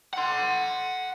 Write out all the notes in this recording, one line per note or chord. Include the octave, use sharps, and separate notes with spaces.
F#5 C6